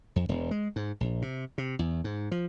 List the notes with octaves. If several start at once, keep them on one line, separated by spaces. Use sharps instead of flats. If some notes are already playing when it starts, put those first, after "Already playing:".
F2
E1
G#3
G#2
A#1
C3
C3
E2
G#2
F3